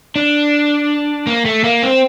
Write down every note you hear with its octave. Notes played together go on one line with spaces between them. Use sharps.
D4
A#3
A3
A#3
C4